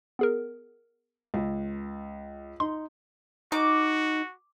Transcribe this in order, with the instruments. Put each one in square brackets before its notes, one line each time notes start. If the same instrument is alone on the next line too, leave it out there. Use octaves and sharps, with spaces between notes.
[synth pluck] B3 G#4 A#4
[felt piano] C#2
[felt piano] D#4 [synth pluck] C6
[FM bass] D#4 [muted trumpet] F#4 [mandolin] D6